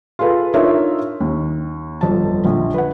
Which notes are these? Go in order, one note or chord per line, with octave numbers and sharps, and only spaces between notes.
F4 G#4 A4 B4 F5
D4 D#4 F4 A#4 C#5 E5
D#2
G1 F2 A5
A#1 D3
B4 F#5